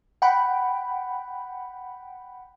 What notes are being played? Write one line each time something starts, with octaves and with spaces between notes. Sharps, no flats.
F#5 G5 B5